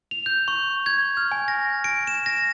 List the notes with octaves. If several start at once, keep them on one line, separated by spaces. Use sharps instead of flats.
F7
G6
C#6
G#6
F6
G#5
A#6
D7
E7
A#6